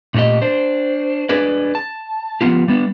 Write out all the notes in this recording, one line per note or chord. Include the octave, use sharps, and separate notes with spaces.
A#2 A3 D#4 G4 D#5
D4 C5
D4 G#4 B4 D5
A5
F3 F#3 B3 F4 G4
G3 B3 D4